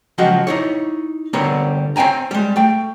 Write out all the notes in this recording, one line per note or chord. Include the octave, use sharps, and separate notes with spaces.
C#2 F3 F#3 F#4 G4 D#5
D#4 E4 C#5
D3 G3 B3 C4 A#4 C#5
C4 C#5 G5 G#5 A#5
G3 G#3
A3 G5